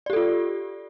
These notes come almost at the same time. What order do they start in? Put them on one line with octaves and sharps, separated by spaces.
D5 G4 A4 F4